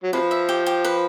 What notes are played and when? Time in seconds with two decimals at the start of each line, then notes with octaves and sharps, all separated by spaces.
0.04 F#3
0.13 C3 F3 B4
0.31 E5
0.49 G4
0.66 G4
0.84 B4